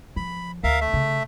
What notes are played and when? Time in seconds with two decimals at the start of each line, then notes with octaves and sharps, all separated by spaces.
0.16 F3 B5
0.64 D2 A#4 E5 F5
0.81 A3 E5
0.93 C#3